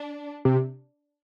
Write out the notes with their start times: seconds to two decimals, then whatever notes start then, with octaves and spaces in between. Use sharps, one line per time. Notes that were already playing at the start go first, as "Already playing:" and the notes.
Already playing: D4
0.45 C3